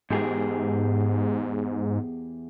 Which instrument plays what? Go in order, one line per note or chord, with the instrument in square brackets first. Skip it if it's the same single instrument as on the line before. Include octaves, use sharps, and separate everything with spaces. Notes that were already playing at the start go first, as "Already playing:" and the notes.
[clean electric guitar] E2 G4 G#4 [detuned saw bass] G#2